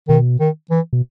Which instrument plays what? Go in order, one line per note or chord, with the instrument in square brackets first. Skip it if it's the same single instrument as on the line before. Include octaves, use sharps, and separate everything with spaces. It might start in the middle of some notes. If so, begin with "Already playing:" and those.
[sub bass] B2 [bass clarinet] D#3
[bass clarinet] D#3
E3
[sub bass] B2